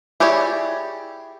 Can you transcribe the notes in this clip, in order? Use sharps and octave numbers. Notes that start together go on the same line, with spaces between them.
E4 G4 G#4 C#5 D5